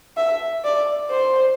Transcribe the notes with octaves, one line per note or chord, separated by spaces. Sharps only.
E5
D5
C5